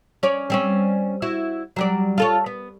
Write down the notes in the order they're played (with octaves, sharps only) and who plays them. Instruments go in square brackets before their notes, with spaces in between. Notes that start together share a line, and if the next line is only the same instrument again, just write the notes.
[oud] C#4 C#5 D5
G3 C4 C#4
E4 F#4
F#3 G3 D5
F4 A4 C#5
B3